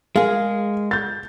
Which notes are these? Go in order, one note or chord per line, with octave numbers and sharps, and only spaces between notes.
G#3 G#4 A#4 F5
G6 A6